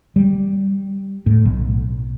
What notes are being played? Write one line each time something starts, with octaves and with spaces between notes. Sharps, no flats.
G3
A2
B1